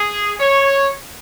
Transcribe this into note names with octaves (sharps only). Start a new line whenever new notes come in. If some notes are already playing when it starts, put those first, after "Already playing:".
Already playing: G#4
C#5